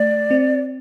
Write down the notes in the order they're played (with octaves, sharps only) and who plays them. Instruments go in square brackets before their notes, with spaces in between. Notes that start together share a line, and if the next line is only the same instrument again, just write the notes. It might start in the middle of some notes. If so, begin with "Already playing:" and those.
Already playing: [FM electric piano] A3 [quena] D5
[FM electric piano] C4